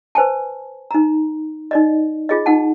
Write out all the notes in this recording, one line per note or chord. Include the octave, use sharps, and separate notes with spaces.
B4 C5 G#5 A5
D#4 A#5
D#4 D5 D#5
F4 G#4 D#5
D#4 F#5 A5